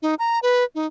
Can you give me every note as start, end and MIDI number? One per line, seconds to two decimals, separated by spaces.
0.02 0.15 63
0.19 0.39 82
0.43 0.64 71
0.75 0.87 63